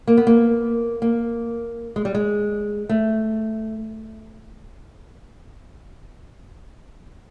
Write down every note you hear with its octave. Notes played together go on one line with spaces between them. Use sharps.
A#3
B3
A#3
A#3
G#3
G3
G#3
A3